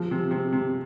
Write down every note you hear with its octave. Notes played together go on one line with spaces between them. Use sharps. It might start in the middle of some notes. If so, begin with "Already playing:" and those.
Already playing: F3
C3
C3
C3